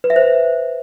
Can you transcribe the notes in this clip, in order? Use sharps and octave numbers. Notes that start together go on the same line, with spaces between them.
B4
E5
C5